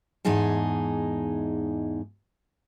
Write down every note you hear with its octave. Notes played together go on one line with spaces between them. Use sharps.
E2 G#2 G#3 D#4 G#4 A5